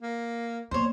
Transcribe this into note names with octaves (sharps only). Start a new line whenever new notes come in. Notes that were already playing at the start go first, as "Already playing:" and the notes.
A#3
A#3 B3 C5 C#5